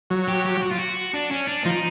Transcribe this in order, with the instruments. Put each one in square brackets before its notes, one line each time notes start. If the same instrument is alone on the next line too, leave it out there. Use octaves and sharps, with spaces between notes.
[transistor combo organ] F#3
[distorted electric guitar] G4
G4
F#4
F4
F#4
D4
C#4
D4
[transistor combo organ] F3 [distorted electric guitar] D#4